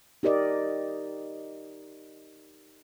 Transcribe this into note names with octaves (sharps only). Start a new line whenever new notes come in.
D#4 G4 A#4 D5 D#5